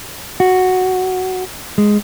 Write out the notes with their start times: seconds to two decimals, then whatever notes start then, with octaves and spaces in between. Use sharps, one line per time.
0.40 F#4
1.78 G#3